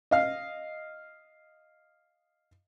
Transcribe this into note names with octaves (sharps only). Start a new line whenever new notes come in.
D#5 F5